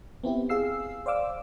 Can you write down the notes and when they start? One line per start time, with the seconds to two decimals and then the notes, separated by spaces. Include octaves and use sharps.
0.24 B3 C4 E4 G4
0.49 G#4 F5 E6 C7
1.06 C5 D5 F5 D6 E6